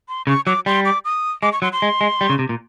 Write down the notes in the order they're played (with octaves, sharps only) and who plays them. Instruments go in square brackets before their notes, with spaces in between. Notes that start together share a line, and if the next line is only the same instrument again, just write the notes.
[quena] C6
[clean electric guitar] C#3 [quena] C#6
[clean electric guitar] F#3 [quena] D6
[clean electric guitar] G3 [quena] C6
[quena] D6
D#6
[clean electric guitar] G#3 [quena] D6
[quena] C#6
[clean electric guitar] F#3 [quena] C6
[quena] C6
[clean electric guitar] G#3
G#3
G3
C#3
C3
A#2